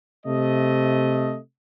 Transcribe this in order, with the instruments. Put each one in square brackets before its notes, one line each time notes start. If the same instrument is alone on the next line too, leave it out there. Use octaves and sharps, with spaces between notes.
[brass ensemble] C3 A3 D#5